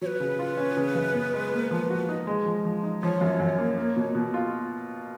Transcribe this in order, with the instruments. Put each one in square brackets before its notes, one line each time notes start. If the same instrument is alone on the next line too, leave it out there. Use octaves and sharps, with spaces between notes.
[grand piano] F#3 [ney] C#5
[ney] B4
[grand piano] C#3
F4
C#4
C#3
F#2
B3
G#3
A#3
F3
F#4
D#4
G#3
F3
F3
D#4
[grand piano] F3 [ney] C#5
[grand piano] F#2
F#2
A#3
A#3
B2
B2
F4